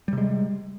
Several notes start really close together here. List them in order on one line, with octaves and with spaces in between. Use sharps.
G3 C3 G#3